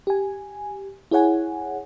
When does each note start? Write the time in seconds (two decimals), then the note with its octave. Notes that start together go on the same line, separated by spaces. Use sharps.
0.07 G4 G#5
1.11 E4 G#4 C#5 F#5 G#5